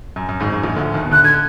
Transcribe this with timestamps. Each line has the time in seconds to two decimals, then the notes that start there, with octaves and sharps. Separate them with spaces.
0.16 F#2
0.29 F#2
0.40 G#1 G#2
0.52 F#2
0.63 A#1 A#2
0.76 D2 D3
0.94 D#2 D#3
1.05 B2
1.11 D2 D3 F#6
1.24 D3 G#6